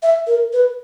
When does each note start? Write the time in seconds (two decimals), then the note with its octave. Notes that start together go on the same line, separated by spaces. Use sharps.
0.03 E5
0.27 A#4
0.53 B4